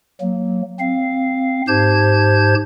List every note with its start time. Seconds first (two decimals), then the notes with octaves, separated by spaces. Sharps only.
0.21 F#3 A#3
0.80 C4 F5
1.68 G#2 G4 C5 A5 G6 G#6